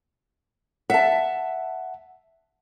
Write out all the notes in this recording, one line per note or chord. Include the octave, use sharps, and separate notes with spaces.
E5 F#5 A5